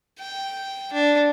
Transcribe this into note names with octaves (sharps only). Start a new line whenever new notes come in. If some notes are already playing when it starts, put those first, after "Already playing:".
G5
D4